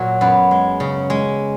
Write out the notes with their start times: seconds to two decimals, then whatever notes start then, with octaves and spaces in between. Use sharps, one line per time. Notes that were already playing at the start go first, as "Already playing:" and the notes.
Already playing: A#2 F#3 F#4 A#4
0.21 F#2 B3
0.51 G#3
0.80 C#3
1.10 G#3